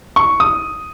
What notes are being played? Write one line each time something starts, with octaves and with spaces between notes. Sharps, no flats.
C#6
D#6